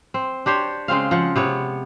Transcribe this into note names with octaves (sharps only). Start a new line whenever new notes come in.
C4
D4 G4 C5 C#5
C#3 G#3 C4 F5
F3 F#5
C3 B3 C#5